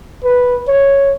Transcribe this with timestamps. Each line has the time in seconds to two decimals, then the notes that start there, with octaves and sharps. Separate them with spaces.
0.24 B4
0.68 C#5